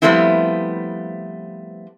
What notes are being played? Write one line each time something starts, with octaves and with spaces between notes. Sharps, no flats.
F3 G3 A3 B3 C4 E4